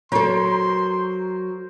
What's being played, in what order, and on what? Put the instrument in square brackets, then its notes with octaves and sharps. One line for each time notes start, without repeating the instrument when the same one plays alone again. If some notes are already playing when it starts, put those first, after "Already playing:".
[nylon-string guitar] F#3 A4 [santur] A#4 C5 C#6 [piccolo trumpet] C6